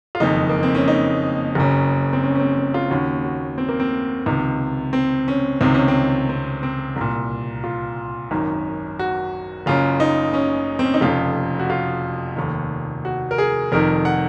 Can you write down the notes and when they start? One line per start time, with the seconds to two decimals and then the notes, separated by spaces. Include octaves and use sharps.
0.15 F4
0.20 F#1 F2 D#3 D#4
0.49 A#3
0.63 C4
0.75 C#4
0.88 D#4
1.55 F#1 F#2 C#3
2.13 C4
2.24 C#4
2.35 C#4
2.39 C4
2.57 C#4
2.74 F4
2.90 D#2 C#3 F#4
3.24 F#4
3.58 C4
3.69 A#3
3.80 C4
4.26 C#2 C3 D#3
4.93 C4
5.28 C#4
5.61 C#2 C3 D#3 C4
5.74 C#4
5.88 C4
6.29 C4
6.63 C4
6.96 C2 A#2
7.64 F4
8.31 G#1 F#2 D#3
8.99 F#4
9.66 F#1 F#2 C#3 F4
10.00 D#4
10.34 C#4
10.79 C4
10.86 C#4
10.94 D#4
11.01 F1 F2 C#3 F4
11.59 F#4
11.70 F4
12.36 F1 D#2 D#3
13.05 F#4
13.31 A#4
13.38 G#4
13.72 F1 F2 D#3 A#4
14.05 F#5